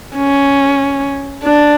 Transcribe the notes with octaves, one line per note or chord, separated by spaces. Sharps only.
C#4
D4